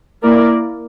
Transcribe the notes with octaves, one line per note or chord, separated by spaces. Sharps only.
A#3 E4 A#4 D5